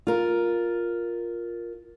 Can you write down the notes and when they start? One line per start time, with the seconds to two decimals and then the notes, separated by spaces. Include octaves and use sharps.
0.07 F4 A#4